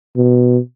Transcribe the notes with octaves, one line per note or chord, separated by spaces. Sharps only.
B2